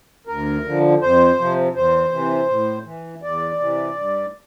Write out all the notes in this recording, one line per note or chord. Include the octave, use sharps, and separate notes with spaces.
D2 A#4
D3 F3
F2 C5
C3 F3
E2 C5
C3 E3
A2
E3
E2 D5
C3 E3
G2